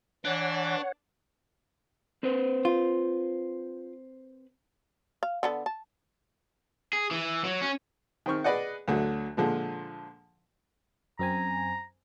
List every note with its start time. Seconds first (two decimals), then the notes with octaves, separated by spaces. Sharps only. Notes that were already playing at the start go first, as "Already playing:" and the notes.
0.25 E3 D4 C#5 F#5
2.23 C4 B4 C5
2.65 F4
5.23 F5
5.43 D3 B3 A4
5.66 A5
6.93 G#4
7.11 E3
7.44 F#3
7.62 C#4
8.26 D#3 C4 C#6 F6
8.44 G#4 B4 D5 D#5 F#5
8.88 D2 D3 F#3
9.37 A#2 D3 F3 G#3
11.19 F#2 C4 G#5 A#5